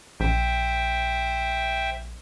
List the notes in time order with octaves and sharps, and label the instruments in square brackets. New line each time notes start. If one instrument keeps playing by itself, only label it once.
[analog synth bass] A#1 [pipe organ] C5 E5 G5